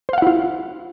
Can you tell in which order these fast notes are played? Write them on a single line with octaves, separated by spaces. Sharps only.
C5 F5 F#5 E4 F4